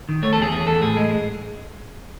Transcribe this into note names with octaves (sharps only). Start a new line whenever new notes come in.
D#3
A3 C#5
A4
E2 G#4
E2 G#4
E2 A4
A2 G#4
G#3
G#3